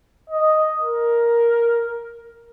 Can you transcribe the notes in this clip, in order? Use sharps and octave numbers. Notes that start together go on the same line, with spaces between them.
D#5
A#4